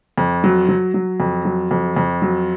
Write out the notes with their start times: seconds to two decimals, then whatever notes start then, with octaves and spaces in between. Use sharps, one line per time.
0.18 F2
0.44 F#3
0.69 F#3
0.94 F#3
1.20 F2
1.45 F#3
1.71 F2
1.96 F2
2.22 F#3